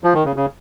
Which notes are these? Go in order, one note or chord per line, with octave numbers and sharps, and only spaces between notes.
F3
D#3
C#3
C#3